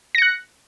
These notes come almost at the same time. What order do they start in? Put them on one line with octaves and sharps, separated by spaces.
A#6 C#7 F#6